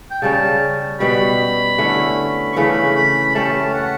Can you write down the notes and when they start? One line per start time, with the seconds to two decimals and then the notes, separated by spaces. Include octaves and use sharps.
0.11 G5
0.22 C#3 G3 C#4 A5
1.00 B2 G3 B3 F#4 B5
1.78 D3 A3 C#4 E4
2.53 C#6
2.56 C#3 E3 A3 C#4 B5
2.96 B5
3.35 A3 C#4 G4 A5
3.74 F#5